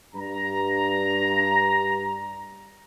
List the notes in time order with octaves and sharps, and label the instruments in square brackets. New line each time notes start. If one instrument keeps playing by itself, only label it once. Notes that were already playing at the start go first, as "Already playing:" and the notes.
[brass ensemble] G2 A#5